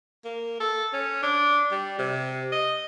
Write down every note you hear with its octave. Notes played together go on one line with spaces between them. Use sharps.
A#3
A4
C#4
D4
G3
C3
D#5